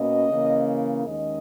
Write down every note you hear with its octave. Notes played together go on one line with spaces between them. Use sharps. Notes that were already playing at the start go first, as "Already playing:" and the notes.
Already playing: B2 A#3 C#4 D#5
C#3 E3 A#3 C#4
D#2 D#3 G#3 C#4 D#5